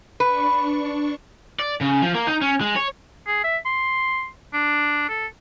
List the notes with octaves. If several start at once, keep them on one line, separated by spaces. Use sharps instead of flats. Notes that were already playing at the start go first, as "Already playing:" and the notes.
D4 B4 C#6
D5
C#3
F3
A#3
D#4
C#4
G#3
C#5
G#4
E5
C6
D4
A4